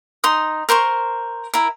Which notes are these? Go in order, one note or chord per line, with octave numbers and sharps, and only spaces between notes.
D#4 C6 D#6
A#4 C5 C6 C#6
E4 A#4